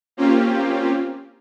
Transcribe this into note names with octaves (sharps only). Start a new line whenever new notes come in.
A#3 C4 C#4 F4 G4